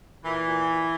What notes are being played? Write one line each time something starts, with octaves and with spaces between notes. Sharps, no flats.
A#2 E3
A#2
A#2